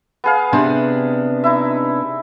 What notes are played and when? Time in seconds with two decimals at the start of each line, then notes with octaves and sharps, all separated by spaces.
0.24 B3 G#4 F5
0.53 C3 B3 D4 C5
1.44 D#4 E4 E5